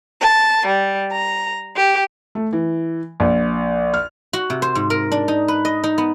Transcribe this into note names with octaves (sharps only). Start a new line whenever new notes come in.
A5
G3
A#5
G4
A3
E3
A#1
F6
F#4
C3
C5
G#2
A#4
D4
D#4
B4
D#5
D#4
B3